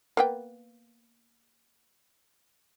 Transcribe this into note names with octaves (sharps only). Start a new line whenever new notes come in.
A#3 B3 G5